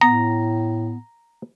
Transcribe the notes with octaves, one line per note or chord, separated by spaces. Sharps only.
A2 B3 A#5